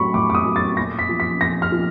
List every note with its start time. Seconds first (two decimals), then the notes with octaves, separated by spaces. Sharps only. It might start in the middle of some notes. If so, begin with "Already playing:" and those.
Already playing: A2 F#3 B5 C#6
0.14 A2 D6
0.30 D6
0.35 D#6
0.45 F#3
0.56 A6
0.77 A#2 A#6
0.99 B6
1.09 F3
1.20 B6
1.41 A#2 A#6
1.62 F6
1.72 F3